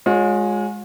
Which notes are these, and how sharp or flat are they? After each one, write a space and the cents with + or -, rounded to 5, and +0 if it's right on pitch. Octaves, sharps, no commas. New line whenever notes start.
G#3 +0 F4 +45 C#5 +0